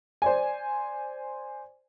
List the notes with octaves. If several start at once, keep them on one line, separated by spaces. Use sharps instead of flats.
C5 D5 G#5